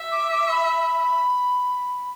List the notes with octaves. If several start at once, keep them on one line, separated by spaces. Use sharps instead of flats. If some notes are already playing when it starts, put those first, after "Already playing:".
Already playing: E5
D6
D6
B5